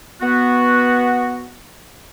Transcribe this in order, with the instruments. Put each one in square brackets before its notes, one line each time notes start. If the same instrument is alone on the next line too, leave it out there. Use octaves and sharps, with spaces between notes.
[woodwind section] B3 F#4